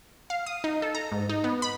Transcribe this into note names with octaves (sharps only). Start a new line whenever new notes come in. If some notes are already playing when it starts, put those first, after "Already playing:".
F5
D#6
D#4
A4
A#5
G#2
D#4
B3
B5